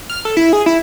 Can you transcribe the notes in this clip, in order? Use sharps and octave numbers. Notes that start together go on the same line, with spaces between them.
F6
A4
E4
G#4
E4